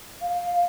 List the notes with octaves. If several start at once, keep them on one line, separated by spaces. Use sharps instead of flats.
F5